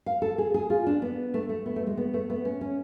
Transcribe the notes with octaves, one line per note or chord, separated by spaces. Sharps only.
F5
A4
G#4
G#4
F4
D4
B3
A3
A3
B3
A3
G#3
B3
A3
B3
C#4
C#4